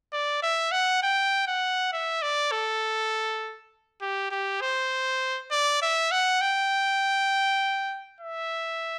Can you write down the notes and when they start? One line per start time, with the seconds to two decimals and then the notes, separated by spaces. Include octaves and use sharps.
0.12 D5
0.42 E5
0.72 F#5
1.02 G5
1.47 F#5
1.93 E5
2.22 D5
2.51 A4
4.01 G4
4.31 G4
4.61 C5
5.51 D5
5.82 E5
6.11 F#5
6.41 G5
8.20 E5